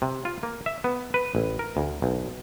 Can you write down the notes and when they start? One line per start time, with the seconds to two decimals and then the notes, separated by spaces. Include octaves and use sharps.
0.02 C3
0.25 F4
0.43 A#3
0.66 E5
0.84 B3
1.14 B4
1.35 A1
1.59 A#4
1.77 D2
2.02 B1